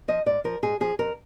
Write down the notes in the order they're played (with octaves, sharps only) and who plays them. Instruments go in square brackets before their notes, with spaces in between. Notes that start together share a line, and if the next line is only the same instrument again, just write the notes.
[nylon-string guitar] F3 D#5
G#2 D5
F3 A#4
G#2 G#4
F3 G#4
F2 A#4